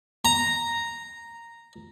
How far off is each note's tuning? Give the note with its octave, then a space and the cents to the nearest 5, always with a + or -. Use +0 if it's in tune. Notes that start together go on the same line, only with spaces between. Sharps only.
A#5 -5